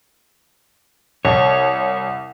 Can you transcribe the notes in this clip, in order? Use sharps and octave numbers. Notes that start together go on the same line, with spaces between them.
C2 C#5